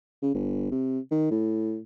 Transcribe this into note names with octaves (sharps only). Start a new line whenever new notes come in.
C#3
G1
C3
D#3
A2